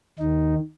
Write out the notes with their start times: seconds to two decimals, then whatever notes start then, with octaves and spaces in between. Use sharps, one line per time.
0.19 D#2 D#3 D#4